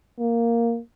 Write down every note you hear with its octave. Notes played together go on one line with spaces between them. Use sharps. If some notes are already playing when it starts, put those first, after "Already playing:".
A#3